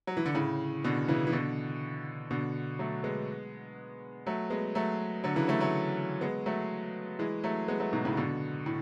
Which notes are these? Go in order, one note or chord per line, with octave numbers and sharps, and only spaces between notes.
F#3
E3
D3
A2 C#3
B2 D3
C#3 E3
E3
B2 D3
B2 D3
F#3 A3
G#3 B3
F#3 A3
G#3 B3
F#3 A3
D3 F#3
C#3 E3
F#3 A3
F#3 A3
G#3 B3
F#3 A3
E3 G#3
F#3 A3
G#3 B3
F#3 A3
G#2 B2
A2 C#3
B2 D3
A2